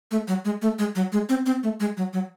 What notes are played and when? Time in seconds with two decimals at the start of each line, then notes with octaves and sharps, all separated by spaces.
0.11 A3
0.28 F#3
0.45 G#3
0.62 A3
0.79 G#3
0.95 F#3
1.13 G#3
1.29 C4
1.46 C4
1.63 A3
1.80 G#3
1.97 F#3
2.13 F#3